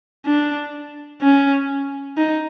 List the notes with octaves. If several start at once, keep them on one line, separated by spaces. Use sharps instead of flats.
D4
C#4
D#4